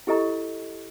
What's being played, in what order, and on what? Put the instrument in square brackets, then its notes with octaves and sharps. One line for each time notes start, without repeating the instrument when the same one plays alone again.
[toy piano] E4 G4 A4 D#5 A#5 C#6